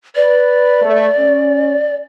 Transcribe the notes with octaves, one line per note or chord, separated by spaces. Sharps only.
B4 D5
A3
C#4